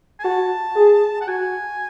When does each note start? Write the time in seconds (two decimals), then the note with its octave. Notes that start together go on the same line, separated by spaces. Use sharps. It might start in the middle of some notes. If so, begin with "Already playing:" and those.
0.19 G#5
0.24 F#4 A5
0.76 G#4
1.21 F#5
1.28 F#4 G#5